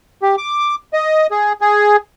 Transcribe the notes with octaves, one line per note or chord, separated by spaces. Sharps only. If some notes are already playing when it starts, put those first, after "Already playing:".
G4
D6
D#5
G#4
G#4